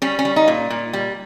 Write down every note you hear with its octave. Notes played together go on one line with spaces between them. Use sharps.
G3 C#4
C#4
G3
D#4
A#2
A#2
G3